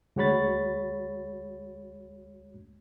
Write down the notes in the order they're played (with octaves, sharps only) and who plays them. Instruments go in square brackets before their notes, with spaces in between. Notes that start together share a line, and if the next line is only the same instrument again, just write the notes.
[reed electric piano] D2 G#3 F#4 C#5 B5 A6